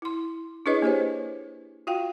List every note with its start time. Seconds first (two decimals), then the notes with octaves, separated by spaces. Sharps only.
0.02 E4 C6
0.66 D4 E4 G#4 B4 C#5 D#5
0.82 A#3 G4 C5 C#5
1.87 F4 F#4 F5 G5